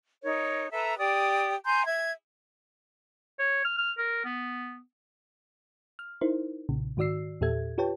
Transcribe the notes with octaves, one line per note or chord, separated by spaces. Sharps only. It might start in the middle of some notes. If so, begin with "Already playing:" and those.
D#4 A#4 C#5
A4 B4 E5 A#5
G4 D5 D#6
G#5 A#5 C6 G6
E5 G#6
C#5
F6
F6
A#4
B3
F6
D#4 E4 A#4 C5
B1 A#2 C#3
G#2 D#3 F#4 D5 E6 C7
E2 A#2 G4 A4 E5 G#6
F4 G4 B4 C#5 G5 A5